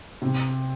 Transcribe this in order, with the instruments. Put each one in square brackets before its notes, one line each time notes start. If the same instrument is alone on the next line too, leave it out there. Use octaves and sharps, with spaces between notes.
[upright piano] C3